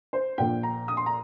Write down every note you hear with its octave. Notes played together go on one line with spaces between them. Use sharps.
C5
A#1 A#2 A#3 G5
A#5
D#6
C6
A#5